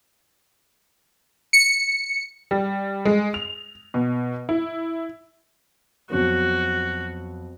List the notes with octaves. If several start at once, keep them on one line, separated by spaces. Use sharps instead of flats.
C#7
G3
G#3
F7
B2
E4
F2 F#3 B3 F#4